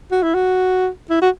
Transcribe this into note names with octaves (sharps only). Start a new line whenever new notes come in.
F#4
E4
F#4
E4
F#4